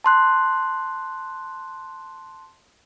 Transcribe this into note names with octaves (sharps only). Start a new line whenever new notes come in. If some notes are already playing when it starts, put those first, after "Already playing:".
A5 C6 F#6